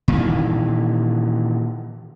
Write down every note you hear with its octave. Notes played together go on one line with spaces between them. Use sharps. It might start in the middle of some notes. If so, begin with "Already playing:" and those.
A#2 D#3 E3